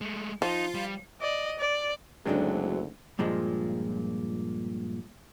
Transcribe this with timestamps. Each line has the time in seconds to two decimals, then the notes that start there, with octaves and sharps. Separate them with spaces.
0.01 G#3 A3
0.42 F3 D#4 F4
0.74 G3
1.21 D5 D#5
1.59 D5
2.25 F#1 D2 D3 F#3 G#3 C4 D4 D#4
3.19 G2 A#2 F3 G#3